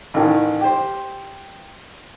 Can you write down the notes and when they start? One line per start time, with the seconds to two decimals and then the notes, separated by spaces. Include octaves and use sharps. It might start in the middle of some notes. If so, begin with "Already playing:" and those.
0.14 A1 D#3 E3
0.61 G4 C5